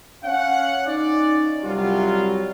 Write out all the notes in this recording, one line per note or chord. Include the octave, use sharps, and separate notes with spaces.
C#4 F5 F#5
C#4 D#4 D5
C2 F#3 G3 F4